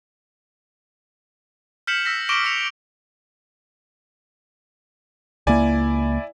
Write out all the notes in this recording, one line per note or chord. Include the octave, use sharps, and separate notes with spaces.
F6 G6 B6 C#7 E7 F#7
E6 A#6 B6
C#6 D6 A#6 D7 E7 G7
C#6 E6 F6 A#6 C#7 F7
C#2 A#3 E4 D5 G#5